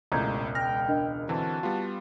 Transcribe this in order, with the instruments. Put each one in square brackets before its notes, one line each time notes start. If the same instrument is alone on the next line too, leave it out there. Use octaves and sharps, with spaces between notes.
[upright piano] E1 C#2 [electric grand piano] A2 [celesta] A#5 G6 G#6
[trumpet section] G5 [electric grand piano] F6 [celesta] A#6
[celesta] D4 A#4 D#5
[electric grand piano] D3 E3 C4 [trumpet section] F#4 A5
[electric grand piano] G3 B3 F4